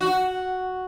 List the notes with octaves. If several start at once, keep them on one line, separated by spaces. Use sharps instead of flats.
F#4